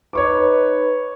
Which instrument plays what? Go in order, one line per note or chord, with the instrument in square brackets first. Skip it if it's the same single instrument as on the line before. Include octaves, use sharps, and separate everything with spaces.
[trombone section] D#4 B4 [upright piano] C#5 C#6 D6